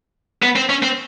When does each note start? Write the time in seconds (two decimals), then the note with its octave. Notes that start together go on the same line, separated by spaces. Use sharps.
0.42 B3
0.56 C4
0.69 C#4
0.82 C4